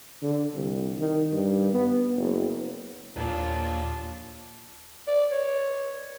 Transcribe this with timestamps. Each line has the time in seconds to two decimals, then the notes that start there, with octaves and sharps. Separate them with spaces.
0.23 D3
0.55 C2
0.99 D#3
1.32 G2
1.73 B3
2.17 F#1
3.16 D#2 A#2 F3 D4 F4 C#5 A5
5.07 D5
5.31 C#5